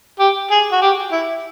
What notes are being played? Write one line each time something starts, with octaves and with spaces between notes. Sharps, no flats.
G4
G#4
F#4
G4
E4